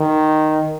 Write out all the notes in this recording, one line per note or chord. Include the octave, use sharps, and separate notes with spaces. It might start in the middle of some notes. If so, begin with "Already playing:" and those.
Already playing: D#3